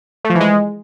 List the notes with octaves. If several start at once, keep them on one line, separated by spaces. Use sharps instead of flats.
A3
F3
E3
G#3